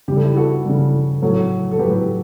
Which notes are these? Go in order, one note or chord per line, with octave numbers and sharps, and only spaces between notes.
C#3 G3 G4 A4
E4 G4
F#4 A4
C#3 G3
A2 F#3 A4 C#5
A4
A2 F#3 G4 B4